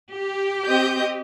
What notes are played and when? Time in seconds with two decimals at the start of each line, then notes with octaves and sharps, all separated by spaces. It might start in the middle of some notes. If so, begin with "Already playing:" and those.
0.12 G4
0.66 C4 D#5 G6